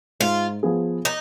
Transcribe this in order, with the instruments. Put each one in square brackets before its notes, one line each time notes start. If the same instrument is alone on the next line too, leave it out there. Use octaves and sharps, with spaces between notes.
[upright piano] G#2 [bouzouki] F4
[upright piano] F3 B3 F4 G#4
[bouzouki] D#4